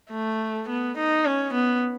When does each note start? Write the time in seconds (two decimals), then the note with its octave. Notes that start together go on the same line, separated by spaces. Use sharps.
0.11 A3
0.68 B3
0.97 D#4
1.26 C#4
1.53 B3